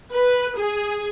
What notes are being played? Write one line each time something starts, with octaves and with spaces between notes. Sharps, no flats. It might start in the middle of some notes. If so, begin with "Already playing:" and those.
B4
G#4